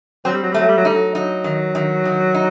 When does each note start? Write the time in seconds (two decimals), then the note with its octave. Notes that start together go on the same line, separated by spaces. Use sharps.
0.25 F#3 C4
0.33 G3
0.43 F#3
0.51 G3 A3
0.60 F#3
0.68 G3
0.77 F#3
0.85 G3 D#4
0.95 F#3
1.15 F#3 D#4
1.44 D#3
1.75 D#3
2.05 D#3
2.34 D#4